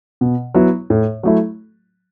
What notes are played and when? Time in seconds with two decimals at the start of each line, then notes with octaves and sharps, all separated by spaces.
0.21 B2
0.54 F#3 B3 E4
0.90 A2
1.23 F#3 A3 E4